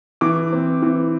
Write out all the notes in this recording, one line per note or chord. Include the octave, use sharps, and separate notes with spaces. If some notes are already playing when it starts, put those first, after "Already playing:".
E3 D6
C4
E3